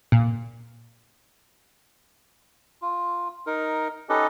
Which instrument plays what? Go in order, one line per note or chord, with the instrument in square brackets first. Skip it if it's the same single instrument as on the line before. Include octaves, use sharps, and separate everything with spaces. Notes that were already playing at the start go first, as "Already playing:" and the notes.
[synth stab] A#2
[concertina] F4
D#4 A#4
C#4 D#4 G4 A4 B4 D#5